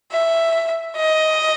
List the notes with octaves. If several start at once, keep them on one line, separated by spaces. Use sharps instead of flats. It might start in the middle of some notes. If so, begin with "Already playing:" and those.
E5
D#5